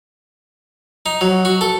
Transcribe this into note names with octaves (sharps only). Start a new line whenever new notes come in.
D#4
F#3
F#4
A4